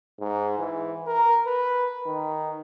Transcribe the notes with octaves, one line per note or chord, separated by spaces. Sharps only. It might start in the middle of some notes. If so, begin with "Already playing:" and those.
G#2
E3
A#4
B4
D#3